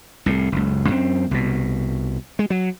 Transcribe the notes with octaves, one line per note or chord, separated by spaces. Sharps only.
C2 A2
F#1 C#2
F#2 C4
C2 B2
G#3
F#3